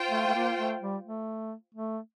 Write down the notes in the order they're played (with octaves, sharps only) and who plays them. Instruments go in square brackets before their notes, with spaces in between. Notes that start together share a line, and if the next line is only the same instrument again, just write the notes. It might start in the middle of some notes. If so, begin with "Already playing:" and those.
Already playing: [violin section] F4 C5 G5
[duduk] A3
A3
A#3
A3
G3
A3
A3